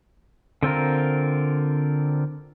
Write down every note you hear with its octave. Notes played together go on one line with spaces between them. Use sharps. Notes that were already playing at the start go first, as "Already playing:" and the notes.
D3 C4 F4 A#4